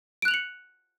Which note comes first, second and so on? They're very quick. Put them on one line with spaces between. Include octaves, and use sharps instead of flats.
D7 F#6 F7 F#7 C#7